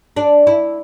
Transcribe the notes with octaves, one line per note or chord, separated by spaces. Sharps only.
D4
E4